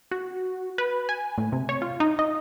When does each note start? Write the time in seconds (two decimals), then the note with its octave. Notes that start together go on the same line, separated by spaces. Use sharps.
0.11 F#4
0.78 B4
1.09 G#5
1.38 A2
1.52 C3
1.69 C#5
1.82 F4
2.00 D#4
2.19 D#5